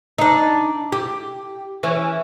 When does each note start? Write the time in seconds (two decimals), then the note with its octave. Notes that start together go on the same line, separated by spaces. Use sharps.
0.18 D4 D#4
0.92 G4
1.83 E3 C#4